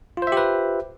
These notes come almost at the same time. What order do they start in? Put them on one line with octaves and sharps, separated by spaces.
F4 C5 E5 G4 B4